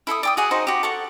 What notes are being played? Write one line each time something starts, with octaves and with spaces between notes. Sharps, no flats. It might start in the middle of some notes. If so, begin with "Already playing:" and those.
E4 A4 G5 D#6
D5 G5 D#6
F#4 G#4 F#5
D#4 F#4 C5 D#5
F#4 G4
A4 F#5 C#6